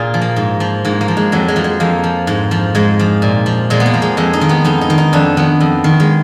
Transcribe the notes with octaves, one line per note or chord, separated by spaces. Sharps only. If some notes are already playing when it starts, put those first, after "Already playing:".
Already playing: A#2 F4 G#4
F3
A#3
G#2
F3
G#2 A#3
A#3
F3
G#3
F2 F#3
G#3
F3
G#3
F2 A#3
F3
G#2
F3
G#2 G#3
F3
A#2
F3
A#2 G#3
B3
A#3
F3
G#3
F2 G#3
D#4
D#3
B3
F2 D#4
D#4
D#3
D#4
F2 D4
D#3 B3
F2
D#3
G#3